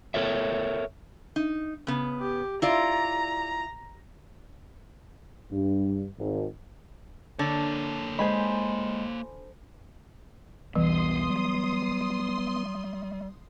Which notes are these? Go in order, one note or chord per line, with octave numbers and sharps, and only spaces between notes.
A4 A#4 C#5 E5
D#4
C#3 B3
G4
E4 F4 D5 A#5
G2
G#1
D3 A#3 C#5 A5
G#3 C5 D#5 G#5 B5
B1 E2 E3 G3 B3 C6 D#6
F#3 G3